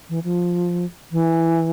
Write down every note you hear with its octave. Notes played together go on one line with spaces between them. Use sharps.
E3
F3
E3